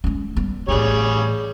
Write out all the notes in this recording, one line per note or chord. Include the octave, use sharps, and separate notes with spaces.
G#3 C#4
G3 B3
A1 G3 D4 G#4 C#5